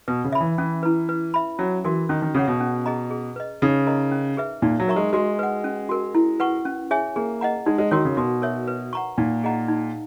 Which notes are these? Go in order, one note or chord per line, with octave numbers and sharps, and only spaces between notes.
B2 B4
C#3
E5 B5
E3
E3 C#4
E4 B4
B4
E5 B5
F#3 C#4
E3 F#4 A#4
D#3 C#4
D#3
C#3 G#4 C#5 F#5
B2
C#4
G#4 D#5 A#5
G#4
B4 D#5
C#3 D#4
A#4 D#5 A#5
C#4
G#4 B4 E5
A#2 D#4
F#3
A#4 E5 A#5 C#6
G#3
G#3 F#4
B4 F#5
C#4
F#4 A#4
E4
B4 F#5 C#6
C#4
G#4 C#5 E5 G#5
A#3 G#4
D#5 F#5 A#5
G#3 D#4
G#3
D#3 F#4 A#4 C#5
C#3
B2 F#4
A#4 C#5 E5
B4
F#5 A#5 C#6
A#2 D#4
G#4 D#5 F#5 A#5
D#4